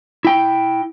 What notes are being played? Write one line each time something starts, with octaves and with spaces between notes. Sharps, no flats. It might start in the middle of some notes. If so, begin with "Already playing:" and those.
E4 G5